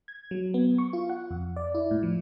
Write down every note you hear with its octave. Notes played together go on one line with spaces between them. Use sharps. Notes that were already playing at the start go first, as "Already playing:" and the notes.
G#6
F#3
B3
C#6
F4
F#5
F2
D5
E4
A2
F3